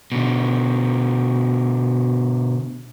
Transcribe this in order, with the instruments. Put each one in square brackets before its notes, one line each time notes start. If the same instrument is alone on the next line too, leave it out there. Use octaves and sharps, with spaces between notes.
[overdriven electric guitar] B2 D3